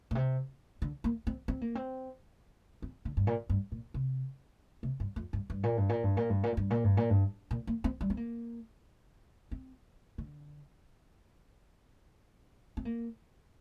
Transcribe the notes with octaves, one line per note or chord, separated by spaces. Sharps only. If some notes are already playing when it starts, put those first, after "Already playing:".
A#2
C3
D3
A#3
C4
C4
A#3
C4
C4
D3
G2
A#2
G2
A#2
C3
C3
G2
F2
G2
G2
A#2
G2
A#2
G2
A#2
G2
A#2
G2
A#2
G2
A#2
G2
A#2
A#3
C4
G3
C4
A#3
C4
D3
C4
A#3